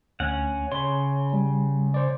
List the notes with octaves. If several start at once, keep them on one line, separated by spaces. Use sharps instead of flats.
D2 C#4 F#5
C#3 C#5 B5 C6
G3
C5 D5